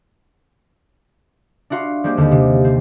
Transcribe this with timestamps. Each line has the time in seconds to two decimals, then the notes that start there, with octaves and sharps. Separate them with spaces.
1.70 D4 E4 F#4 F5 C6
2.04 G3 G#3 A#3 C4 G4
2.17 D#2 D3
2.31 C3
2.64 C4